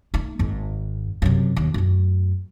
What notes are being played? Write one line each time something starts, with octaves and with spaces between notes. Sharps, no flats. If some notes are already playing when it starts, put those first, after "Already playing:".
A3 D#4
G#1 G#2
F#2 C3
D#2
F#2 A3